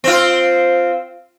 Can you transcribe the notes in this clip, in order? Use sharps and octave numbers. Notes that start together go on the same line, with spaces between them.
C4 F4